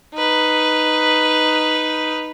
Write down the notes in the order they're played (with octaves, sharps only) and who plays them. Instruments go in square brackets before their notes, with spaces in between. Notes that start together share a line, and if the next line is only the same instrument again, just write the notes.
[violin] D#4 B4